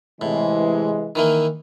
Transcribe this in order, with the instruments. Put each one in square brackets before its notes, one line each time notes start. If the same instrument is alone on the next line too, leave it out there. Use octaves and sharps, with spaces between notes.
[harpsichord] A2 [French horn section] C3 E3 G#3
[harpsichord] D#3 E3 A#3